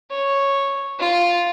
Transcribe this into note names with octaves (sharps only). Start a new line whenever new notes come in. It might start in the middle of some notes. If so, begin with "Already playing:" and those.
C#5
F4